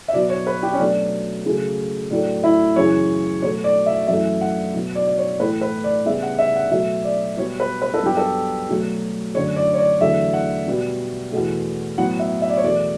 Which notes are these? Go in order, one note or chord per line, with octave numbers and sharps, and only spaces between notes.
E5
B2 F#3 B3 D5
C#5
B4
G4
C#4
B2 F#3 A3 D4
C#3 F#3 A3
A2 F#3 A3 D4
E4
F#2 C#3 E3 C#5
B2 F#3 A3 C#5
D5
E5
F#2 E3 A3 E5
F#5
B2 F#3 B3
D5
D5
C#5
A2 E3 A3 B4
B4
D5
C#3 G3 B3 E5
F#5
E5
F#5
B2 F#3 A3 E5
D5
B2 G3 B3 C#5
B4
B4
A4
G2 F#3 B3 G4
A4
B2 F#3 A3
F#2 D3 A3 C#5
D5
C#5
D5
E2 D3 F#3 A3 E5
F#5
B2 G3 B3
E2 B2 A3
A2 F#3 B3 F#5
E5
E5
D5
C#5
E2 B2 A3 D5